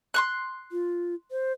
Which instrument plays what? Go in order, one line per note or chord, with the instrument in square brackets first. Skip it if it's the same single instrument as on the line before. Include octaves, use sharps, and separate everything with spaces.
[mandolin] C6 C#6 F#6
[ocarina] F4
C5